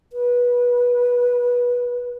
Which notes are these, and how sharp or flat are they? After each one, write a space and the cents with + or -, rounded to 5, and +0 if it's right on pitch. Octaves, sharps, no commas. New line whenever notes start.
B4 -20